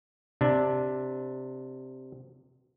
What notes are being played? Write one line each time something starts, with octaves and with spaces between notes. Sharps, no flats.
C3 D4